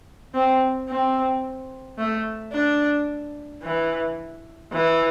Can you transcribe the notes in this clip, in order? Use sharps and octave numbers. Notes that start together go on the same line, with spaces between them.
C4
C4
A3
D4
E3
E3